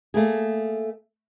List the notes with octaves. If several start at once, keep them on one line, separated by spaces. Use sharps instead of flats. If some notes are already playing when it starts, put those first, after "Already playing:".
A3 A#3 G#4